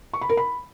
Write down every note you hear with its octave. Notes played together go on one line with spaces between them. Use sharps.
C#6
B5
A#4
B5